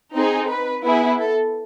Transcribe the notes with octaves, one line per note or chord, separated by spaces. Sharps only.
C4 D#4 G#4
B4
B3 E4 G#4
A4